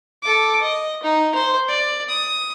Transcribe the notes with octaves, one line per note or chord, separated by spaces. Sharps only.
A4 D6
D#5
D#4
C5
D5
D#6